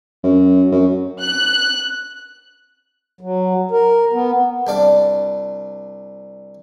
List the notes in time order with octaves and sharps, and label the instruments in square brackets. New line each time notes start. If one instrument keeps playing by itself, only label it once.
[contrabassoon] F#2
F#2
[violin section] F#6
[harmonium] F#3
A#4
B3
[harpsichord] C2 D4 D5 F5